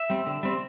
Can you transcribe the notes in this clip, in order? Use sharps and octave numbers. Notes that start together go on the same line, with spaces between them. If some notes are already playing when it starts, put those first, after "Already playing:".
Already playing: E5
G3 C4
D3
G3 C4